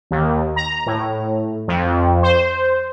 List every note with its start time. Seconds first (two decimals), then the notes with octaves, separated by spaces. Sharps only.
0.11 D#2
0.56 A#5
0.86 A2
1.68 F2
2.23 C5